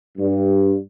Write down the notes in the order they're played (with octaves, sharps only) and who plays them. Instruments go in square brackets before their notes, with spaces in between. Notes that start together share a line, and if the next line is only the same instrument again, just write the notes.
[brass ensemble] G2